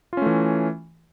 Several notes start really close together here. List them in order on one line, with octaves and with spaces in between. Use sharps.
F4 C#4 A3 E3